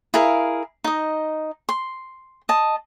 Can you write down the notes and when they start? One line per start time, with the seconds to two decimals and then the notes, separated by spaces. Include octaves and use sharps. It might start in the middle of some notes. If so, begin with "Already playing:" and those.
0.14 E4 G#4 A#4 F5
0.84 D#4 D#5
1.69 C6
2.49 D#5 A5